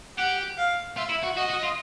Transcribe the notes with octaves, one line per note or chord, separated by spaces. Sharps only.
G4 F#5
F5
F4 E5
E4
F#4
F#4 D#5
F#4
F4